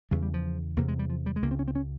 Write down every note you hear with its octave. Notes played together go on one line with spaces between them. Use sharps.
E2 C#3 G3
G3
F3
E2 C3 A#3
G#3
G3
F3
G3
G#3
C#2 C#3 A#3
C4
C#4
C4
C#4